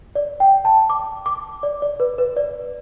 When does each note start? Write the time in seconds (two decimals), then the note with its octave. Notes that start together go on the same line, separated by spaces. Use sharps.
0.15 D5
0.40 G5
0.65 A5
0.90 D6
1.26 D6
1.63 D5
1.82 D5
2.00 B4
2.18 B4
2.36 D5